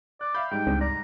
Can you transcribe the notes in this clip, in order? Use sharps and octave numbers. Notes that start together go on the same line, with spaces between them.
D5 F#6
E5 F5 B5 G6
G#2 G3 D#4 G5
C#2 G#3 C4 D4
D5 A#5